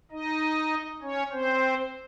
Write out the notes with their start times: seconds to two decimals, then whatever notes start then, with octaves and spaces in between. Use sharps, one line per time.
0.11 D#4 D#5
1.02 C#4 C#5
1.32 C4 C5